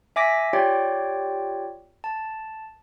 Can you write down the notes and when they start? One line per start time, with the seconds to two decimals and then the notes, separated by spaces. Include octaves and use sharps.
0.16 E5 G#5 D6 A#6 B6 D7
0.53 F4 G4 C#5 D5 G5 D6
2.04 A5